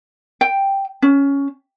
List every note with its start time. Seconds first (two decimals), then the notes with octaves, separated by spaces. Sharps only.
0.41 G5
1.02 C#4